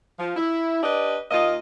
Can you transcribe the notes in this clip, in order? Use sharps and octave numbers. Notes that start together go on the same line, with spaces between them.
F3
E4
D4 G4 B4 D5 D#5
D#2 A#3 F4 D#5